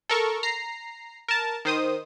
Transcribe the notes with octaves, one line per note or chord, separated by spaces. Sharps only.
A4 A#4 C#6
A#5 C7
A#4 A5
D#3 C5 D#6